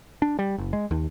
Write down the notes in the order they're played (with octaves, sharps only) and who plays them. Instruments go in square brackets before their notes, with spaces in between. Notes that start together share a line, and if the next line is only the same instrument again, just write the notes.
[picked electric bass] D4
G3
F#1
G#3
D#2